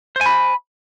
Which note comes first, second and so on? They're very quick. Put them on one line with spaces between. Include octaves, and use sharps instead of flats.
C5 G#5 B5